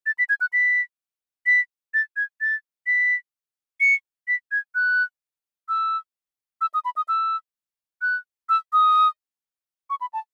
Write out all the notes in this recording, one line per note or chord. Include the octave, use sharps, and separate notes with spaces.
A6
B6
G#6
F#6
B6
B6
A6
G#6
A6
B6
C#7
B6
G#6
F#6
E6
E6
D#6
B5
D#6
E6
F#6
E6
D#6
C#6
B5
A5